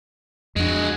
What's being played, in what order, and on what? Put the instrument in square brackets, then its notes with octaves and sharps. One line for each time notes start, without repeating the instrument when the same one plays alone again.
[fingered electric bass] F2 D4 [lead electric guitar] G#3 F#4